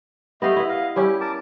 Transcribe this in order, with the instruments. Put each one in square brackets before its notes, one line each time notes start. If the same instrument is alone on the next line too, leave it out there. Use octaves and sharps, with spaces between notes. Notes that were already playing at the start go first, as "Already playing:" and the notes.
[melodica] A3 D#5 [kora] B3 G4 F5
[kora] E4 B4
[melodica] D#5 F5
[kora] G3 C#4 E4 [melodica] G4
[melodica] A#4 A5 D6